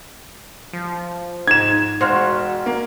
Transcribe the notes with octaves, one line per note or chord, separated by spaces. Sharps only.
F3
G#2 G#6 E7
E1 F#4 C5 F5 F#5
A#3